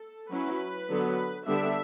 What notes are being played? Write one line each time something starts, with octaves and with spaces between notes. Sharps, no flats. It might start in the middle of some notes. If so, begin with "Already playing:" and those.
Already playing: A4
F#3 C#4 E4 B4
D3 F#3 B3
D3 G3 B3 D4 E5